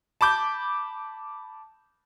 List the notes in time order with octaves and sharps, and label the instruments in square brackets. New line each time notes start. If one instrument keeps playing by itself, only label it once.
[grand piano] A5 B5 D6 G6